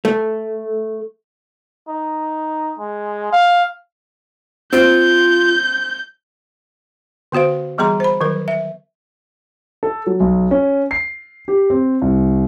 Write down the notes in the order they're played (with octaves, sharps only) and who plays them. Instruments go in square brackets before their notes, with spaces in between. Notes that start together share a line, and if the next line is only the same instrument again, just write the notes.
[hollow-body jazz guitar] A3
[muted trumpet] D#4
G#3
F5
[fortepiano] C4 [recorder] F4 [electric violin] G6
[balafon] D3 B3 F#4 C5 F5
E3 G3 B3 G#4 A#5 C6
C5 B5
D#3 F#3 A#4
E5
[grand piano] A4
F#3
B1
C#4
C7
G4
C4
C2